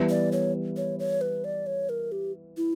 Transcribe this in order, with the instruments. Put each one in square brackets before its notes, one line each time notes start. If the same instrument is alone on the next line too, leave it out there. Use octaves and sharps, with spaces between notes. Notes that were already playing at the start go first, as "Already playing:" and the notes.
Already playing: [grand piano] E3 G3 B3
[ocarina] D5
C#5
C#5
C#5
B4
D5
C#5
A#4
G4
E4